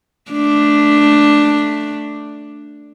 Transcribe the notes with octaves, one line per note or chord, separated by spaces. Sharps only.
A3 D4